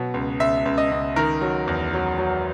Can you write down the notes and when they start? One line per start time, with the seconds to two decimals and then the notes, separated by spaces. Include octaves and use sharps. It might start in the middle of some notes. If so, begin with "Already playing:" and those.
Already playing: B2 F#3
0.14 C#2
0.40 C#2 E5
0.65 C#2
0.78 D#5
0.91 C#2
1.16 D#3 A#4
1.42 F#3
1.67 E2
1.93 F#3
2.18 F#3